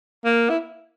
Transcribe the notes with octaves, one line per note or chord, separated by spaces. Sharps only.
A#3
E4